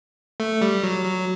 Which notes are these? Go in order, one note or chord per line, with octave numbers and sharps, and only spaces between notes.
A3
G3
F#3
F#3